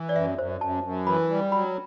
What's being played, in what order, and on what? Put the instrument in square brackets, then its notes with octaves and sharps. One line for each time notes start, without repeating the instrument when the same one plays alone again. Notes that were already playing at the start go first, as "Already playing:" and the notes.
Already playing: [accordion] E3
[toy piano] D5
[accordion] F#2 [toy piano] E5
[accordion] F#2 [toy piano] C5
[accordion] F#2 [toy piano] A5
[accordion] F#2
[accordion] E3 [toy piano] B5
[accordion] G3
[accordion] F#3 [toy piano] B5